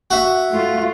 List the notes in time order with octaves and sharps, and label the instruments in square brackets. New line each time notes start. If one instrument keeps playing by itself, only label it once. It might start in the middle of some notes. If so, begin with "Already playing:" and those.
[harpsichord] F#4 E5
[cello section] A3 F4